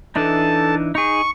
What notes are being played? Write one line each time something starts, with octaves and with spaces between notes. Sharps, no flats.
E3 D4 D#4 A4 A5
D#4 G#4 C#6